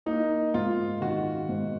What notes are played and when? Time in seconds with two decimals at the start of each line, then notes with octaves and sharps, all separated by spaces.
0.06 A#3 D#4
0.54 G#2 F4
1.01 D#3 F#4
1.49 G#2